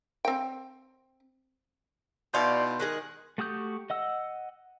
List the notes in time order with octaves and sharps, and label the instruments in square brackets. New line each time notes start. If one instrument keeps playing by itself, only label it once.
[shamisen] C4 G5
[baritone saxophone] B2 [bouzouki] D#4 E4 F5 [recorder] D5 [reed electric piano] C6 G6
[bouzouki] D#3 G#3 G#4 [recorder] F#6
[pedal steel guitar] A3 F#4 G4 D#6 G6
D#5 F#5 E6